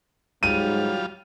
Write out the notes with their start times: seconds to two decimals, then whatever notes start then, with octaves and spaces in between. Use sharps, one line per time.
0.43 G#2 F#3 G3 F4 D#7